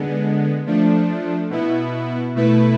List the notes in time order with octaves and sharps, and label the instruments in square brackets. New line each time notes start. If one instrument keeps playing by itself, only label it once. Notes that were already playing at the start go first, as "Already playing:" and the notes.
Already playing: [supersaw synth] D3 G#3 B3
F3 A3 D4
B2 B3 E4
B2 A3 E4 B4